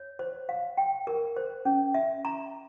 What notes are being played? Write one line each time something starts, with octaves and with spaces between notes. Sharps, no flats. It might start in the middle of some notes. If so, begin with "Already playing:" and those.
Already playing: C#5
C5
F5
G5
A#4
C5
C#4
E5
A#5